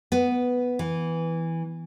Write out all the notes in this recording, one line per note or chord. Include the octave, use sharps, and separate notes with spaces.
B3
E3